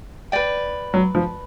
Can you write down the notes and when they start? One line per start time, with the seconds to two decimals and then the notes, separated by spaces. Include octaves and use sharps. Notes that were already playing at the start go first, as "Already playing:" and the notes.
0.32 B4 D5 G5
0.94 F#3
1.15 F3